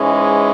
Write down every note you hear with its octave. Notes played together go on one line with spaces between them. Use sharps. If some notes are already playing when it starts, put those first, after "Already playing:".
Already playing: G#2 E3 G#3 C#4